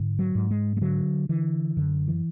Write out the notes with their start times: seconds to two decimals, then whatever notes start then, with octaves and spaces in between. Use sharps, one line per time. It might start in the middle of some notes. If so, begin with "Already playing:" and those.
Already playing: G#2 D3
0.19 F#3
0.35 G#2
0.51 G#3
0.77 G#3
0.81 D3 F#3
1.29 D3 E3
1.77 F#2 D3
2.08 E3